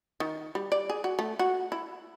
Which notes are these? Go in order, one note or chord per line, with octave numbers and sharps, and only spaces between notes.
D#3
G3
D5
G#4
F#4
A3
F#4
E4